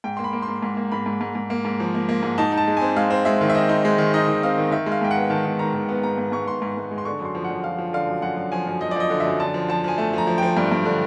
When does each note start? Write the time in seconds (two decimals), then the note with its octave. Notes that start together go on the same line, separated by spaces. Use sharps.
0.04 G#2 G5
0.17 A#3 C6
0.24 B5
0.33 A#3
0.42 C6
0.48 G#2
0.62 G#2
0.77 A#3
0.92 G#2 B5
1.06 G#2
1.21 G#2
1.35 G#2
1.50 A#3
1.65 G#2
1.80 F3
1.95 A#3
2.09 A#3
2.23 G#2
2.38 D#4 A5
2.52 D#4
2.57 A5
2.68 G#3
2.77 C4 G#5
2.96 G#3 F5
3.10 C4
3.25 G#3 E5
3.41 D#3
3.50 E5
3.55 C4 D#5
3.69 D#4
3.85 G#3
3.98 D#3
4.14 D#4 D#5
4.28 D#3
4.43 C4 F5
4.58 D#3
4.71 D#3 E5
4.86 G#3
4.92 F5
5.02 G#2 G5
5.11 B3 F#5
5.30 D#3 A5
5.45 D#3
5.59 D#3 A#5
5.74 D#3
5.89 B3
6.03 G#2 A#5
6.18 G#2
6.32 G#2 C#6
6.47 G#2 C6
6.62 G#2
6.77 G#2
6.91 G#3
6.98 C6
7.05 D3 C#6
7.20 F#2 C6
7.35 F3
7.44 F#5
7.50 F#2
7.64 F3 F5
7.78 F3
7.93 D3 F5
8.08 F#2
8.22 F#2 F#5
8.37 F#2
8.52 F3 G#5
8.67 F#2
8.81 F3 D#5
8.91 D5
8.96 F3 D#5
9.10 D3
9.20 E5
9.26 F#2
9.40 D3 A5
9.54 F3
9.68 F3 A5
9.84 F3 G#5
9.98 A3 A5
10.13 F3
10.18 A#5
10.27 F3
10.38 F3 G5
10.57 G2
10.72 G2
10.85 D3